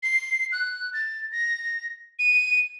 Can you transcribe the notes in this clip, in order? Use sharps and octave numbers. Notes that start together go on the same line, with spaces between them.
C7
F#6
A6
A#6
D#7